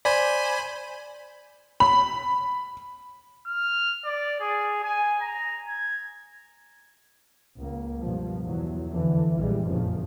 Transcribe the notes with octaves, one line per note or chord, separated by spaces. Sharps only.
C5 D5 G#5 B5
B5
F6
D5
G#4
G#5
A#5
G#6
C#2 A#3
G2 B2 F3
E2 E3 F#3
F2 D3 E3
A#1 F2 E3 G3 G#3
F1 F#2 A#2 C#3 E3 F3